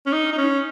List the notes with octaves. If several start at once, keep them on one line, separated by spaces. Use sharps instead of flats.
C#4
D#4
D#4
C#4